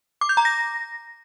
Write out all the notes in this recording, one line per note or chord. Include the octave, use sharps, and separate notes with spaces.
D6
G6
A#5
A#6